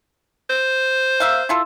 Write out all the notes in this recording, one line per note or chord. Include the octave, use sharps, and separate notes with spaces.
C5
A#3 E5 F5
E4 F4 A4